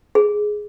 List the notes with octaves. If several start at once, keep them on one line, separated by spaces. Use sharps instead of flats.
G#4